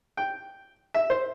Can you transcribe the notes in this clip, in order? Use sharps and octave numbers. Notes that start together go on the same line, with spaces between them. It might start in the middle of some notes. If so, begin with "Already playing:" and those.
G5
E5
C5